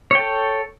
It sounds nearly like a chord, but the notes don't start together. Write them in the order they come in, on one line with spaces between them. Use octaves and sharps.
C#5 G5 A4